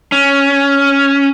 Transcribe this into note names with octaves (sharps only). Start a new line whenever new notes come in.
C#4